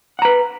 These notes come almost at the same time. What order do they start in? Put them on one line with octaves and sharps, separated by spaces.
F#5 A#5 B4